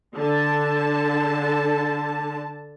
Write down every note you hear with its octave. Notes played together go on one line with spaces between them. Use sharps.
D3 A5